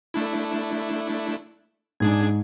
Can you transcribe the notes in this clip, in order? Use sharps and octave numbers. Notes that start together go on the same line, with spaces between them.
A3 D4 E4
G#2 D4 G#4 G#6